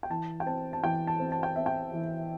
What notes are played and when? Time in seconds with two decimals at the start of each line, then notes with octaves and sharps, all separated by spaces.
0.03 G5
0.10 E3 A5
0.40 G5
0.46 C4 A5
0.73 A5
0.84 E3 G5
1.07 A5
1.20 C4
1.32 A5
1.43 G5
1.56 C4 E5
1.66 G5
1.93 E3